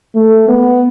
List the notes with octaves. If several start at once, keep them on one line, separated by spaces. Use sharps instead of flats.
A3
B3